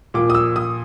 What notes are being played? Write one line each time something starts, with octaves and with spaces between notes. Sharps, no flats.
A#2 F3 D6
D#6
E6
D#6